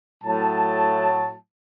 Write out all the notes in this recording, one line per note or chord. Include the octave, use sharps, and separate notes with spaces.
A2 F#3 A5